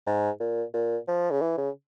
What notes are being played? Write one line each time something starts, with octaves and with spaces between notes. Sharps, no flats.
G#2
A#2
A#2
F3
C#3
E3
C#3